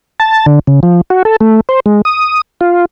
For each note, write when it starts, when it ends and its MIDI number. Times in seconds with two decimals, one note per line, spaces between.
0.20 0.46 81
0.46 0.59 50
0.67 0.80 49
0.83 1.01 53
1.10 1.23 66
1.25 1.36 69
1.41 1.61 57
1.69 1.80 72
1.86 2.02 56
2.05 2.41 87
2.61 2.85 65